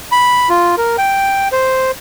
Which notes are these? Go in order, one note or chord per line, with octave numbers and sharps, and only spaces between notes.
B5
F4
A#4
G5
C5